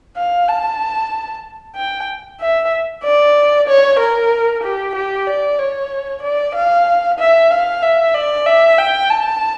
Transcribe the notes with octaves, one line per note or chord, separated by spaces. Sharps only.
F5
A5
G5
E5
D5
C#5
A#4
G4
G4
D5
C#5
D5
F5
E5
F5
E5
D5
E5
G5
A5